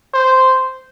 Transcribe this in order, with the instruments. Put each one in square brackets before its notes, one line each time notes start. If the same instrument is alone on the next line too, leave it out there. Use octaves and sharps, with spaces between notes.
[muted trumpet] C5